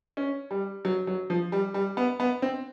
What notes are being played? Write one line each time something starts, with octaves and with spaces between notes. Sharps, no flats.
C#4
G3
F#3
F#3
F3
G3
G3
B3
B3
C4